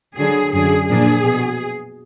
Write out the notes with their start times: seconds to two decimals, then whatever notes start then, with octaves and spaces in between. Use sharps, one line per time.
0.18 D3 F#3 D4 G#4
0.53 F#2 D3 F#3 D4 G#4
0.88 A#2 F3 A#3 D4 G#4
1.24 B2